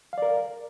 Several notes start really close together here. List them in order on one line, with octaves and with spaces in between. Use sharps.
F5 D5 A#4